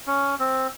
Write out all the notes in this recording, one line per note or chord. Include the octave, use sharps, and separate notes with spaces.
C#4
C4